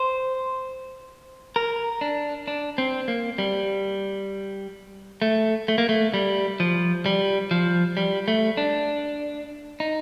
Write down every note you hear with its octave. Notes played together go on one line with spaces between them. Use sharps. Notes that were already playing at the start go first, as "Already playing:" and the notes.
Already playing: C5
A#4
D4
D4
C4
A#3
G3
A3
A3
A#3
A3
G3
F3
G3
F3
G3
A3
D4
D#4